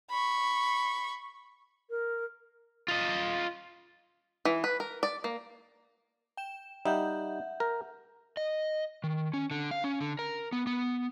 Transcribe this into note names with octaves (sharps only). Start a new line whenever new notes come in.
B5 C#6
A#4
F4 D#5
E3
B4
A#4
D5
A#3
G5 E7
G3 D#4 E5 F#5 G6
A#4
D#5
D#3
C#4
D3
F5
C#4
D3
A#4
B3
B3